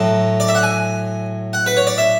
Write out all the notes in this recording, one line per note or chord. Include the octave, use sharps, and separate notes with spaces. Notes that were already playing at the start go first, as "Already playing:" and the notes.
Already playing: A2 F#3 A5
D5
E5
F#5
G#5
F#5
B4
C#5
D5
E5